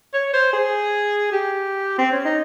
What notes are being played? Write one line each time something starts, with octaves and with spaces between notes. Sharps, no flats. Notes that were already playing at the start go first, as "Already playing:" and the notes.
C#5
C5
G#4
G4
C4
C#4
D#4